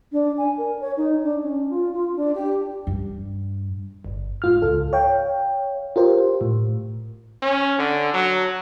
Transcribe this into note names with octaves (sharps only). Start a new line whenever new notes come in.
D4
G#5
A#4
C#5
D#4
D4
C#4
F4
F4
D4
G4
G2
G1
G#2 F4 F6
C#2 A4
C#5 F5 G5
F4 G4 A#4 C5
A2
C#4
D3
F#3